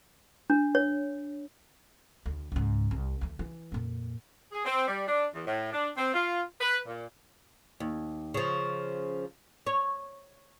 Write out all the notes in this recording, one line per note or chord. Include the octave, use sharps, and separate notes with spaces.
D4
C#5
D2
C#2 G#2
C2
D2 E3
E3
F2 A#2
G#4
C4
G3
D4
E2
A2
D4
C4
F4
B4
A#2
D#2
C#3 F3
C#5